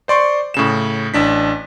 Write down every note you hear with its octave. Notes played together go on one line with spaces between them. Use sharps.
C5 D5 C6 C#6
A2 C#3 E7
A1 D4 B6